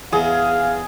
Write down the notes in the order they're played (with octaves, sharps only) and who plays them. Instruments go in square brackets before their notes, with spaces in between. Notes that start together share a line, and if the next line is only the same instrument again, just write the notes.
[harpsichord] E2 [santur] G#4 [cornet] F5